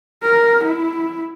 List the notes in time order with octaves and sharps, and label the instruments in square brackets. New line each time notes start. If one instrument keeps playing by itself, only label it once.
[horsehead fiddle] A#4
E4